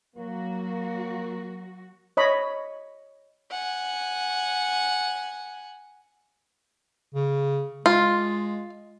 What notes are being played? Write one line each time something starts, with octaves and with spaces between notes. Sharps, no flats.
F#3 A#3 F#4
C#5 D#5 B5
F#5 G#5
C#3
G#3 F4